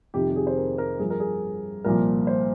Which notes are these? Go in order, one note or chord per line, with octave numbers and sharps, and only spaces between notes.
F2 C3 D#3 G4
G4
G#4
C5
A#4
A#4
G2 F3 G#4
A#4
G#4
C2 A#2 F3 A#4
C5